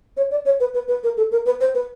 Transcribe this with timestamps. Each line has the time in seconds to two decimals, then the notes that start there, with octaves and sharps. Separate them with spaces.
0.17 C#5
0.31 D5
0.45 C#5
0.60 B4
0.74 B4
0.88 B4
1.03 A#4
1.17 A4
1.31 A#4
1.46 B4
1.61 C5
1.74 B4